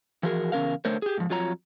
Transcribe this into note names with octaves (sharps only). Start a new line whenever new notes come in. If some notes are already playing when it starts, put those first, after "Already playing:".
E3 F3 F#4 G#4 A#4
E2 C#3 C#4 A#4 F5
D3 A3 A#4 C5 C#5
G4 G#4
G#2 F3
F2 F#3 F4 C#5 A#5